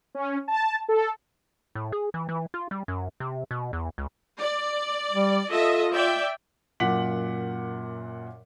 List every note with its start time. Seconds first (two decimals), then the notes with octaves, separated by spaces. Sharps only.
0.15 C#4
0.48 A5
0.89 A4
1.75 A2
1.92 G#4
2.14 E3
2.29 E3
2.54 F4
2.71 G3
2.88 F#2
3.20 C3
3.51 B2
3.73 E2
3.98 C#2
4.40 D5
5.13 G3
5.50 F4 A4 D#5 E5
5.91 D5 E5 G5
6.80 F#2 A#2 F#5 D6 B6 F#7